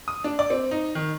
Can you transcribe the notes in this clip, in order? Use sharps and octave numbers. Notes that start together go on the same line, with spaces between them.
D#6
D4
D5
C4
D#4
D#3